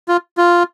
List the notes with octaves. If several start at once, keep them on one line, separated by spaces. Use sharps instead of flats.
F4
F4